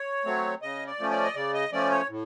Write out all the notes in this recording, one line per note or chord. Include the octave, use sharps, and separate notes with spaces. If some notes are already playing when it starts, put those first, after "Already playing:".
Already playing: C#5
F#3 A3 C4
C#3 D#5
D5
F3 A3 C#4
D5
D#5
C#3 D5
D#5
F3 A3 C#4 D5
C#5
A2